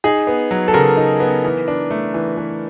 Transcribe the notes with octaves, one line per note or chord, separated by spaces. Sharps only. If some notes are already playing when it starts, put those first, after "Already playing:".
D#4 G#4
B3
F#3
A4
C#3 A#4
D#4
B3
E3
D4
A3
E3
E3